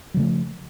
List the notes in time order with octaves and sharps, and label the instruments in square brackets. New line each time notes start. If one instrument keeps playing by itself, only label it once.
[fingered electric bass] F#3
C#3
A3
F3